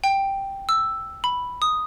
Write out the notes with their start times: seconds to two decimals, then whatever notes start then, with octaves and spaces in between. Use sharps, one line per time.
0.04 G5
0.69 E6
1.24 B5
1.62 D#6